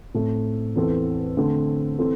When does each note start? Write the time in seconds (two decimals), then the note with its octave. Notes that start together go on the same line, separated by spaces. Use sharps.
0.14 A2 A3 C4
0.76 E2 E3 C4 A4
1.37 D3 A3 C4
1.99 E3 C4 A4